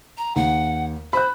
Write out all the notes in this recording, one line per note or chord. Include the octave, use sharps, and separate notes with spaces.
A#5
D#2 F#5
C5 B5 F#6